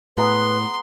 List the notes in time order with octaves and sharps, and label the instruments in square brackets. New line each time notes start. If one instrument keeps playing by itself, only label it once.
[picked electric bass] A2 [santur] G#3 B3 A#5 [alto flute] B4 [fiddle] C6